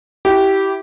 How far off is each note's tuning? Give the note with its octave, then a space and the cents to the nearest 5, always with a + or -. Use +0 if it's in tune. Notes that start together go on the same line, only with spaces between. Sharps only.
E4 +0 G4 -15